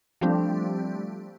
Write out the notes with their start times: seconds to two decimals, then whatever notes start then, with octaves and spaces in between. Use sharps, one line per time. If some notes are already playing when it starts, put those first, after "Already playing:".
0.21 F3 G3 A3 C4 D4 G4